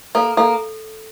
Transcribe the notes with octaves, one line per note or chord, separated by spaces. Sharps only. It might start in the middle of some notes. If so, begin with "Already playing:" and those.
A#3 A4
A#3 A4